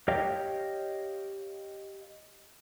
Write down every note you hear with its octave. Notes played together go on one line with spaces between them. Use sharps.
G4 C#5 D#5 F5 G5